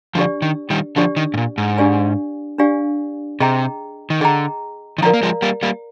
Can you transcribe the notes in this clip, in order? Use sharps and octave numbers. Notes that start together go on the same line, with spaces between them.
D3 F3 D4 G4 D5
D#3
D#3 G3
D3 F3 D4 G4 D5
D#3
G#2
A#2
G#2
D4 G4 D5 F5 G#5
D4 G4 D5 F5 G#5
C3 G#4 D#5 G5 A#5
D#3
D3 G#4 D#5 G5 A#5
D#3
D3 F3 A#4 D5 F5 A#5
A#3
F3 G#3
G3 A#3
G3 A#3